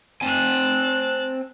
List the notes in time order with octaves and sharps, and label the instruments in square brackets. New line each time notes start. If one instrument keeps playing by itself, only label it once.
[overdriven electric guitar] C4 G#5 [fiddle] A5 F#6